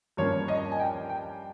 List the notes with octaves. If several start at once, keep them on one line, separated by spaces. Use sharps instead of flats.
G2 F3 A#3 C#4 C#5
D#5
G#5
G5
G5